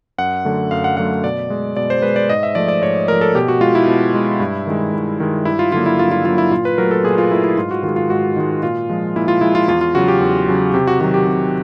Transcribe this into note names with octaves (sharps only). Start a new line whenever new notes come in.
F#2 F#5
D3 F#3 A3
F#2 F5
F#5
D3 F#3 A3 F#5
B2 D5
G#3
B2 D5
C5
G#3 B4
D5
G#2 D#5
E5
F3 A3 D5
D5
G#2 C#5
F3 A3 A#4
A4
B2 G4
F#4
G#3 F4
E4
B2
G#3
G2
D#3 G#3
G2
D#3 G#3
G2 E4
F4
D3 F#3 A#3 F4
E4
G2 F4
F4
D3 F#3 A#3 F4
E4
A#2 F4
B4
F#3 A3 A#4
A4
A#2 G#4
F4
F#3 A3 E4
E4
G#2 F4
F#4
D#3 F4
G#3
F4
G#2 F#4
D#3 G#3
A#2 F4
F3 G#3
A#2 E4
F4
F3 G#3 E4
F4
E2 F4
F4
C#3 F#3 F#4
G4
E2
C#3 F#3
C3 G4
F#4
D#3 F#3 F#4
G4
C3